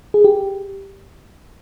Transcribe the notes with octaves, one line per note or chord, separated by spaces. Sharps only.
G#4
G4